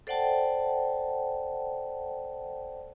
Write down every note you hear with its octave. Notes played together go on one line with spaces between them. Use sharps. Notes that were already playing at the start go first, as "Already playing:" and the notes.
A4 C5 D5 F#5 G5 A5